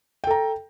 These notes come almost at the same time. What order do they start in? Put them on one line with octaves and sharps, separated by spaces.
G5 A4 A#5